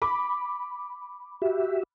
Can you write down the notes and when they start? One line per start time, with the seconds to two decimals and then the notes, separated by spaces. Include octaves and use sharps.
0.02 B5 D6
1.42 F#4 G4 E5